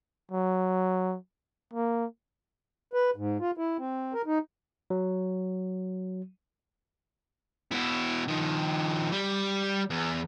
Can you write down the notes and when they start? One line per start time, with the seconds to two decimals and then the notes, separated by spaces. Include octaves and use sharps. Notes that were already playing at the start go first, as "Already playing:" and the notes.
0.31 F#3
1.73 A#3
2.93 B4
3.16 G#2
3.40 F4
3.57 E4
3.79 C4
4.13 A#4
4.26 D#4
4.90 F#3
7.71 B2 E4
8.28 D#3 F3
9.12 G3
9.90 E2